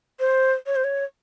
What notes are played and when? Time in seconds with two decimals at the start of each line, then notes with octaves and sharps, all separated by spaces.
0.20 C5
0.66 C#5
0.76 C5
0.84 C#5